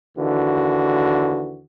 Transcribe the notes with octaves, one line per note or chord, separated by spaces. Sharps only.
D#2 D3 E3 F#4